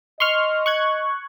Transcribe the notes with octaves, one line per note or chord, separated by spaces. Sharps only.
D#5 C6 C#6 F6
C#6 F#6 G#6